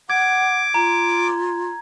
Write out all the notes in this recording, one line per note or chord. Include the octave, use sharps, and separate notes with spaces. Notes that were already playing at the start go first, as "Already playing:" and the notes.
F#5 D6 G#6
F4 A#5